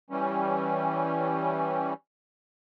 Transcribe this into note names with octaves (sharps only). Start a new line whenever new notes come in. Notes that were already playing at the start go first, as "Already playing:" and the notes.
E3 G3 C#4